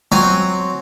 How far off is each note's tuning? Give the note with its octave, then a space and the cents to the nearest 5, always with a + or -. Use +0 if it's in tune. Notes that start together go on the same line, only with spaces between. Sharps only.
F#3 +0 C4 +0 G#5 +0